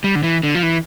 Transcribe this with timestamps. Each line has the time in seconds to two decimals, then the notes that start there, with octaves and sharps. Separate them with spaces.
0.04 G3
0.15 D3
0.23 E3
0.43 D3
0.55 F3
0.63 E3